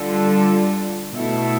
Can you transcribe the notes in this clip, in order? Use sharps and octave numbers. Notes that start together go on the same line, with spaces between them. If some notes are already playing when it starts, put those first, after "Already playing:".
Already playing: D3 G3 D4 F4 A4
B2 A3 E4 A4